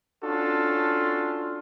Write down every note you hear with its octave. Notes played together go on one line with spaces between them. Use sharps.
C#4 D4 F4 F#4 A4